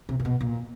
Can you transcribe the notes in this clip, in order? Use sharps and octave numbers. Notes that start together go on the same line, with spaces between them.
C3
A#2
B2
A#2